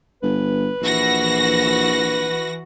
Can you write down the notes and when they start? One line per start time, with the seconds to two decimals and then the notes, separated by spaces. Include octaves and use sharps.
0.23 G1 B4
0.82 A#1 E3 F#4 A#6